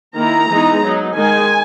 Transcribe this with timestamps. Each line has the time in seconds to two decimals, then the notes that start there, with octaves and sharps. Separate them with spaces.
0.15 D#3 A#3 E4 A#5
0.49 E3 G#3 B3 D#4
0.83 F#3 B3 D#4
1.15 D#3 G#3 D#4 G#5